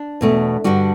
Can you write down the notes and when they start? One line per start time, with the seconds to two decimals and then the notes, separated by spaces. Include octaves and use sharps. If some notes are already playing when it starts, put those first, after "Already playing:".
Already playing: D4
0.21 E2 B2 A3
0.64 G2 D3 G3 F#4